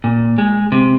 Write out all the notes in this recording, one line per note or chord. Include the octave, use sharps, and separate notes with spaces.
A#2
G#3
C3